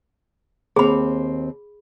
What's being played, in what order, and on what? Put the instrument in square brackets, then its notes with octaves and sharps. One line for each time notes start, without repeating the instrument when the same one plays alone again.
[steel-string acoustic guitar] D#2 C4 [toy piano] G#4 B5